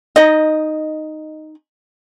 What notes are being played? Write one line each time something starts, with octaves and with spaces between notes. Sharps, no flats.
D#4 D#5